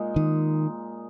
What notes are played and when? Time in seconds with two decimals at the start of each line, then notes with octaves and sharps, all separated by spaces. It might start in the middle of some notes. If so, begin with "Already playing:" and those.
Already playing: A#2 G#3 D#4
0.16 D#3